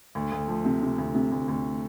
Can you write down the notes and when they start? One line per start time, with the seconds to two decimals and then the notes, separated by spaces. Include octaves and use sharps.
0.15 D2
0.32 D2
0.48 F3
0.65 C3
0.82 C3
0.98 D2
1.15 C3
1.32 D2
1.48 D2